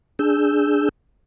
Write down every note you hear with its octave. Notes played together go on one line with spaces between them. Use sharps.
D4 G#4 E6 G6